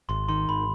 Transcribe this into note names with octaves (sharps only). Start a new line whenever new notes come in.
G#1 C6
D#3 C6
G#1 B5